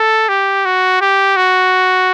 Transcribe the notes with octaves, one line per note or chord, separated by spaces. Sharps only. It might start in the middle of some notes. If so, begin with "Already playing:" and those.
Already playing: A4
G4
F#4
G4
F#4